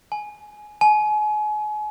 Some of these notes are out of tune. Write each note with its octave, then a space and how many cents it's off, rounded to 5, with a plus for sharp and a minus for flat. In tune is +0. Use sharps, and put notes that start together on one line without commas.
G#5 +15
G#5 +35